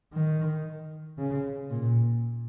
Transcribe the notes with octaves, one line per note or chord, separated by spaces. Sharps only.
D#3
C#3
A#2